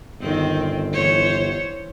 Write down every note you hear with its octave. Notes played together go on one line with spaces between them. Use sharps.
G1 D#3 C4
E3 C5 C#5